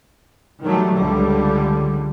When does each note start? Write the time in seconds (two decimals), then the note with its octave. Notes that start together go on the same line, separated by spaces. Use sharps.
0.63 D#3 F#3 G3 A3
0.95 C#2 D3 G3